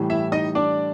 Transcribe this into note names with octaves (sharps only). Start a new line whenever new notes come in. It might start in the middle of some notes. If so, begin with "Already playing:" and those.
Already playing: A2 E3 G3
E4 E5
D#4 D#5
D4 D5